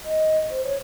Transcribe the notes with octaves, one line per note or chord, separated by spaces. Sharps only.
D#5
C5
C#5